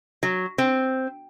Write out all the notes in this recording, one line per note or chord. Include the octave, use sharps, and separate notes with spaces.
F#3
C4